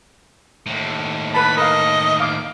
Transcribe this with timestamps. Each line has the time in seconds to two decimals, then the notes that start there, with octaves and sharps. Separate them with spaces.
0.66 D#2 A2
1.34 B4 A5 B5
1.57 A#4 D#5 F5
2.20 F5 D6